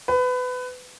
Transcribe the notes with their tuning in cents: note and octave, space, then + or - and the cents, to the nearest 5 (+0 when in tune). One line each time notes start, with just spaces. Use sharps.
B4 +25